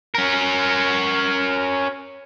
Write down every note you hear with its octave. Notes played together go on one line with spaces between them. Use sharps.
C#4 A#4